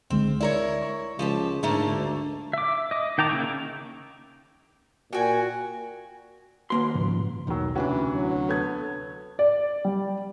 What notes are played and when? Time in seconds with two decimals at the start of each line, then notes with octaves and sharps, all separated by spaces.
0.10 C#2 D3 G#3 C4
0.41 E4 A#4 C#5 D5
0.82 C#6
1.19 C#2 F3 G4 A5
1.63 G#2 D3 A3 A#3
1.91 D2
2.53 E5 D6
2.91 D#5 D6
3.18 D#3 G5 A5 A#5 D6
3.29 C#3 A#3 E4 G5 C#6
5.13 A#2 F#4 G5 G#5
6.70 D#2 A#3 F#4 B4 C6
6.95 G#2 C#3 F3
7.47 B1 E2 D#3 F#3
7.75 D2 C3 E3 C#4 D4 F#4
8.14 F#3
8.49 B3 A4 G#6
9.39 D5
9.85 G3